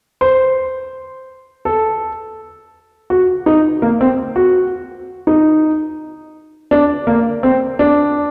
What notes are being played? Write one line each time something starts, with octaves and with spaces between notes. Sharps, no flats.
C5
A4
F#4
D#4
A#3
C4
F#4
D#4
D4
A#3
C4
D4